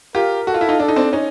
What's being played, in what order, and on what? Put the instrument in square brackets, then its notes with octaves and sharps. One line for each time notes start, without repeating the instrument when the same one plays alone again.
[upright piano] F4 G4 [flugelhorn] A#4
[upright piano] F#4 [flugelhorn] A4
[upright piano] F4
E4
D#4 F4
[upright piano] D4 [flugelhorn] A4
[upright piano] D#4
C4 D4
C#4 D#4